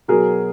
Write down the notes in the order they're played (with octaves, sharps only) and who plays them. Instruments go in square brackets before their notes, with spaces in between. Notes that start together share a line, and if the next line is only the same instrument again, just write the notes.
[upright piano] B2 F#3 G#4 A#4